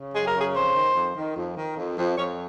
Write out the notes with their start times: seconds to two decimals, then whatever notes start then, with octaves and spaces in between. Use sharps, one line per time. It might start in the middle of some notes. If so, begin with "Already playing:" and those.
Already playing: C#3
0.14 F#2 G#4
0.26 A#4
0.34 C#3 G#4
0.54 F2 C5
0.74 D#3
0.95 F2
1.15 D#3
1.35 F2
1.56 D#3
1.76 F2
1.97 F2
2.16 F2 C#5